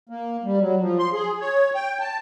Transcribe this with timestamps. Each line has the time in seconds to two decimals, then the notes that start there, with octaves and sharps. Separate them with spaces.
0.09 A#3
0.44 G3
0.61 F#3
0.80 F3
0.99 C6
1.13 G#4
1.40 C#5
1.75 G5
2.00 A5